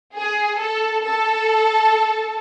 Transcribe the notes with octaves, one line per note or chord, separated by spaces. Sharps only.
G#4
A4
A4